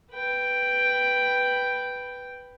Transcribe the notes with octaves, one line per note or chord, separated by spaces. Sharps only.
B4 G5